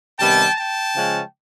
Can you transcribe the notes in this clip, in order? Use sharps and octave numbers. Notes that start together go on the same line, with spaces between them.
C3 D#3 G3 B3 G5 A5
G5 A5
C#3 F3 G#3 C#4